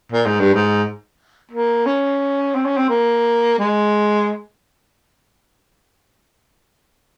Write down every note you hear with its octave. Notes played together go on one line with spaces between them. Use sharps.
A#2
G#2
G2
G#2
A#3
C#4
C4
C#4
C4
A#3
G#3